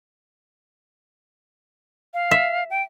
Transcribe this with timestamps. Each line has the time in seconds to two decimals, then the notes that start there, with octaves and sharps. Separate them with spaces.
2.14 F5
2.31 E5
2.70 G5